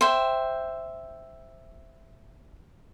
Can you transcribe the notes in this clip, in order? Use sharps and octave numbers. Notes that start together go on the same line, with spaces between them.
C5 E5 G5